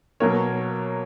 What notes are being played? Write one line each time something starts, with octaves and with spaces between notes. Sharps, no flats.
B2 F#3 A#3 A#4 C#5